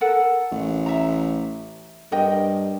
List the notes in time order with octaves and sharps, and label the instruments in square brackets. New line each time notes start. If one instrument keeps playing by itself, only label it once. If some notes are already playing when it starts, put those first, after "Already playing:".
[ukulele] A4 A#4 F#5
[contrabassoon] A1
[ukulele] E5 A#5
[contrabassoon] G2 [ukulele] A#4 D#5 G5